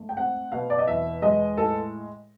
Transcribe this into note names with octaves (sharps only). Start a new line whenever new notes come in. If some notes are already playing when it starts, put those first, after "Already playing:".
Already playing: G#2 A3
G5
C4 F#5
B2 F5
D5
D#5
E2 E5
G#3 D#5
A2 A4